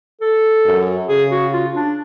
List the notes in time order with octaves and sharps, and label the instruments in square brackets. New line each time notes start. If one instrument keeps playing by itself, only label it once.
[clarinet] A4
[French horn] F#2
[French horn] C#3 [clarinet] G#4
[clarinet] F#4
F4
D4